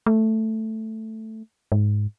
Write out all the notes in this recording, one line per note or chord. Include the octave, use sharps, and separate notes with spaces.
A3
G#2